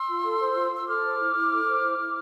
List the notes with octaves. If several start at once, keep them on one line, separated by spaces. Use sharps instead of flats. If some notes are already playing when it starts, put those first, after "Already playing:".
Already playing: C6 E6
F4
A4
C5
F4
F4
E6
A4 D6 F6
C5
E4
E4
A4
C5
E4
E4